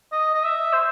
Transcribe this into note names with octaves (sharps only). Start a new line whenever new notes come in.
D#5
D#5
E5
C5